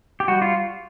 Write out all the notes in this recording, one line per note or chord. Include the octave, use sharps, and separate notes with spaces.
G4
G3 F#4
F4